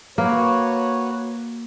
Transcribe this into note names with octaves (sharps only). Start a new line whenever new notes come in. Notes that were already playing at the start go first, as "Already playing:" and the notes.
A#3 F#4 B4 C#5